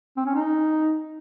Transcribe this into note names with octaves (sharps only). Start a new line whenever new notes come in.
C4
C#4
D#4